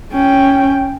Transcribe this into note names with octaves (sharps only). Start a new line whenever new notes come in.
C#4 G5